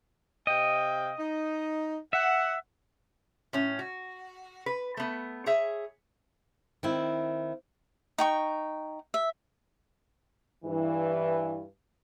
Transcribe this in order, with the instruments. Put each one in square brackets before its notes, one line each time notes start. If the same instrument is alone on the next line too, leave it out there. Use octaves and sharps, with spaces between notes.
[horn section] C3 F5 G5 [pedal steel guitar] D#5
[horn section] D#4
[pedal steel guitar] E5 [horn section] F#5
[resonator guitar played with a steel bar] A2 C#4
F#4
B4
A3 B3
G#4 C#5 E5
[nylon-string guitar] D#3 C4 E4
[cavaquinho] D#4 G5 C#6
E5
[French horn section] G2 E3